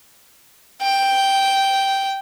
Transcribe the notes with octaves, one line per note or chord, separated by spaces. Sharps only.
G5